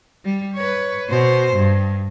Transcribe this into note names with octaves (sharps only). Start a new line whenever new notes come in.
G3
B4 C#5
B2 C5
G2